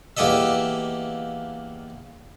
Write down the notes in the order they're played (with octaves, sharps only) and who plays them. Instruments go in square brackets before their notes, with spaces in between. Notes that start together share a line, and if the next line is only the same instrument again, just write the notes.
[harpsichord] E2 A#3 G4 A4 D#5 E5